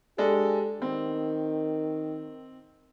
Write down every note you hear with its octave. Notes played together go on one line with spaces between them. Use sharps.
G#3 D4 G4 A4
D#3 C4